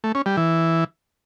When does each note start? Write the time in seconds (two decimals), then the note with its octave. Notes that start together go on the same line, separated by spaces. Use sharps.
0.04 A3
0.15 C#4
0.26 G3
0.37 E3